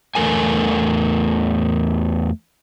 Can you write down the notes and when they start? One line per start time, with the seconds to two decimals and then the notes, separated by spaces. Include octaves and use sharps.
0.15 E2 A3 A#4 G#5